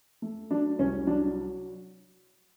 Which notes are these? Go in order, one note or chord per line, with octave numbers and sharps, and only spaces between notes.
A3
F#3 D4
C2 C#4
F#3 D4